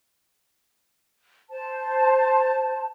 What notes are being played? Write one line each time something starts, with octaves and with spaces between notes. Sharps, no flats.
C5 A5